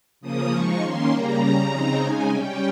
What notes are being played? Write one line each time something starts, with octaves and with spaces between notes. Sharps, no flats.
C#3 F3 A#3 D#6
F3 G#3 D#4 C#6
D#3 A#3 C#4 C6
C#3 G3 A#3 A#5
C#3 G3 C#4
C#3 F3 C4 D#4
C#3 G#3 D#4 G#5
C3 G3 C#4 G5